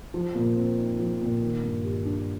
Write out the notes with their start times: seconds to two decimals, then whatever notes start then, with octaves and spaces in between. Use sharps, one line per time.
0.14 F3
0.35 A#2
0.56 C4
0.78 D#4
0.99 F3
1.21 A#2
1.42 D#3
1.63 G2
1.84 G3
2.05 D4